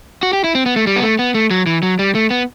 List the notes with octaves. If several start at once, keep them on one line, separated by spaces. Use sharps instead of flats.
F#4
G4
E4
C4
B3
A3
G3
B3
A3
B3
A3
F#3
E3
F#3
G3
A3
B3